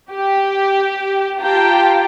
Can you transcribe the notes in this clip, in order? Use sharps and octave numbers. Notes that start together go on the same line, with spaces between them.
G4
F4 G4 G5 A5 A#5